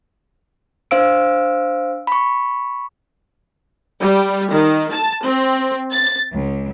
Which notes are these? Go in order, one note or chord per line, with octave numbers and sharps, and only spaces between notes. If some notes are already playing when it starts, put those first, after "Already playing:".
D4 C5 F5 E6 D7
B5 C#6
G3
D#3
A5
C4
A6
C#2